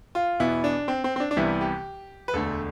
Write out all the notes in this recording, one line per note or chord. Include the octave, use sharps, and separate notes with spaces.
F4
E2 B2 B3 E4
D4
C4
C4
C4
D4
D4
C2 C3 E3 G3 B3 E4
G4
B4
E1 D2 D3 A3 A4